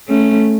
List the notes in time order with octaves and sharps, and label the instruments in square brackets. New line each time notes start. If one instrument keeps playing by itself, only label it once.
[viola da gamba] A3 C#4